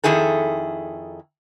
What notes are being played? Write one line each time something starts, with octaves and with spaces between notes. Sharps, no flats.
F2 A#2 D#3 E4 G#4 A4